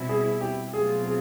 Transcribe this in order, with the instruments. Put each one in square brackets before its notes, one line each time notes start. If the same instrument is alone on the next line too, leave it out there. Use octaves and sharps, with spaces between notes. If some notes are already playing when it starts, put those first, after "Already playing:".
Already playing: [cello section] B2 G3 C4 E4
[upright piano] G#4
G4
[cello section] B2 F#3 A3 C4 F4 [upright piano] G#4
[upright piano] G#4